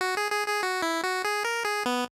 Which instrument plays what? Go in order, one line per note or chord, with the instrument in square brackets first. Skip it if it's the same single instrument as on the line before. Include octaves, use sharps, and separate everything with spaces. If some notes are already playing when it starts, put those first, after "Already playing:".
[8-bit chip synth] F#4
G#4
G#4
G#4
F#4
E4
F#4
G#4
A#4
G#4
B3